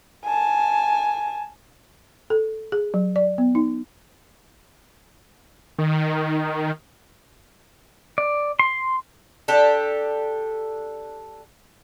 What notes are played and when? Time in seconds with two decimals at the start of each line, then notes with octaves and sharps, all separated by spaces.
0.25 G#5 A5
2.30 A4
2.72 G#4
2.94 F#3
3.16 D5
3.38 B3
3.55 D#4
5.79 D#3
8.18 D5
8.59 C6
9.48 D4 G4 A4